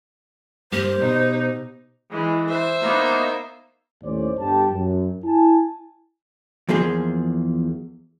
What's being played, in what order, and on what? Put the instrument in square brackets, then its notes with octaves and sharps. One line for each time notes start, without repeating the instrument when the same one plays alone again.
[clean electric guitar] G2 A#3 [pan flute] G4 [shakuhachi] C5
[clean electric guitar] B2 [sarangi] D#4
[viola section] E3 [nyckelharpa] G#3
[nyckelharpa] C5 E5
[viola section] A#3 B3 D#4
[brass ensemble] D#2 A2 C#4 C5 D5
G1 G4 A5
F#2
E4 G#5 A5
[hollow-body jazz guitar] E2 F3 A#3 G#4 C6